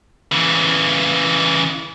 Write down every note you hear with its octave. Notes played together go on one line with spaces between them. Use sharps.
C#3 E3